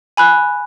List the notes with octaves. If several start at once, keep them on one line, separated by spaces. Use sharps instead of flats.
G#5 B5 F#6